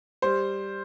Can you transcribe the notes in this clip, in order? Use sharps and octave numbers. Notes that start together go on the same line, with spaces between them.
G3 C5